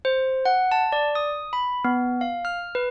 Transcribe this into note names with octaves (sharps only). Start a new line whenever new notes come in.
C5
F#5
A5
D5
D#6
B5
B3
F5
F6
B4